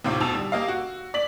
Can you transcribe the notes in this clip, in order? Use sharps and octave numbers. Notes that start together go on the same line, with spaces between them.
D#2 A2 C3 C4 F4 D6
D2 B2 A5 E6 F7
G3
A#3 G4 D#5 F5
F#4
D5 B6 F#7